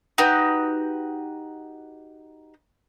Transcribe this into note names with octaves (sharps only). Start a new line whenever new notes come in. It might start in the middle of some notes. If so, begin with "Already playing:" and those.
D#4 F#4 G4 B4